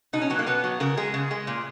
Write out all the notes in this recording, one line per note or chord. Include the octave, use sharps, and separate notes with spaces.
B2 D#4
C#4
F#3 B3
A#3
B2 B3
F#3
C#3 A#4
G#3 G#4
C#3
G#3
A#2